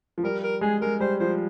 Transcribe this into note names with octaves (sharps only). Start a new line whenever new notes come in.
F3
G3 A#4
A#4
G#3 G#4
G#3 A#4
G3 C5
F3 C5